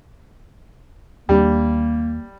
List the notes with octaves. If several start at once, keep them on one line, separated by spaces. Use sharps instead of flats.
D#2 G3 A#3 D4